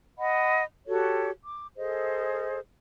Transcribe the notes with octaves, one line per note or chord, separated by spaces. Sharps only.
D#5 F#5 B5
F#4 G4 A4 C#5
D6
G#4 A4 C5 D#5